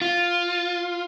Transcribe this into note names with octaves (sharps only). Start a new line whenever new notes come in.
F4